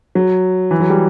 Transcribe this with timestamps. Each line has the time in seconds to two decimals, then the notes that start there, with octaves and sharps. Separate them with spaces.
0.15 F#3
0.71 E3
0.80 F#3
0.90 G3